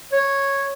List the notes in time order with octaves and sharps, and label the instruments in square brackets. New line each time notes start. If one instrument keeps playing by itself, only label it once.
[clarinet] C#5